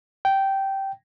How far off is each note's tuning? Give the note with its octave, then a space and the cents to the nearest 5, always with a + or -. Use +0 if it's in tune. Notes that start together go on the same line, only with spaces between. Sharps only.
G5 -10